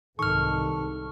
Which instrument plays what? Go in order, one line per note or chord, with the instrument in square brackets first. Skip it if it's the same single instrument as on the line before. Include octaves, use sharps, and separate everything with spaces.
[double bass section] C2 G#2 [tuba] D#3 [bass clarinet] A4 [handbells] C#6 F6